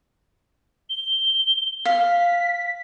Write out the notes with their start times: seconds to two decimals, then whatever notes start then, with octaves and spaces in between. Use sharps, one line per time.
0.90 G7
1.85 F5 B6